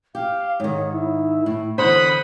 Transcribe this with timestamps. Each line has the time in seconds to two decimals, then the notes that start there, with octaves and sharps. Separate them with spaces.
0.15 G4 F5
0.60 G#2 D#3 C#5
0.92 E4
1.46 A2
1.78 E2 D3 C5 F#5 B5 D#6